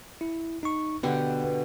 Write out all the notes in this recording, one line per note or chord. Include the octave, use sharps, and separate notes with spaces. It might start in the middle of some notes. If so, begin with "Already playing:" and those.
E4
D#4 C#6
B2 D3 B3 G4 B4